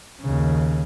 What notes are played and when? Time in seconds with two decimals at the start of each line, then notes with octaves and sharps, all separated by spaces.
0.22 D#2 C#3